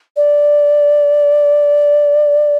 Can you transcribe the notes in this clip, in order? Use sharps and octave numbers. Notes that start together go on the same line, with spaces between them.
D5